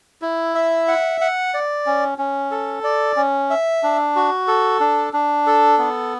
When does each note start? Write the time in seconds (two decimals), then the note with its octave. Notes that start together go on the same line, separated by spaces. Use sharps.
0.22 E4
0.55 E5
0.88 F#5
1.21 F#5
1.54 D5
1.86 C#4
2.18 C#4
2.51 A4
2.84 D5
3.16 C#4
3.50 E5
3.83 D4
4.16 F#4
4.48 A4
4.80 D4
5.13 D4
5.47 A4
5.78 B3